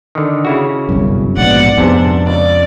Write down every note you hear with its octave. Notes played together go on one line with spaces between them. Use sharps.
D3 D#3
C#3 E4 F#4
G1 C2 F#2
A#1 G#2 B2 D5 F#5
F2 G#2 C3 B3 D4
C#2 D5